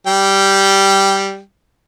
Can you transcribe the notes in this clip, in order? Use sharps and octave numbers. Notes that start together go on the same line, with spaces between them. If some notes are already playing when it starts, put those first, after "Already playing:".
G3 G5